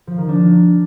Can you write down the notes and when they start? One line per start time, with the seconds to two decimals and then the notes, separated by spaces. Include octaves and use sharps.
0.07 F3
0.18 D#3
0.28 D4